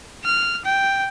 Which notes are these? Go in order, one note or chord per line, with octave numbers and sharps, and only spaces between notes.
F6
G5